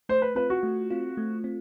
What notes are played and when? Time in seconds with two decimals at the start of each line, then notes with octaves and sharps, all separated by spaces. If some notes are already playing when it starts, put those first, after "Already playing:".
0.09 A3 C5
0.22 B4
0.35 C4 F4 B4
0.50 F#4
0.63 A3
0.90 C4 F4
1.17 A3
1.44 C4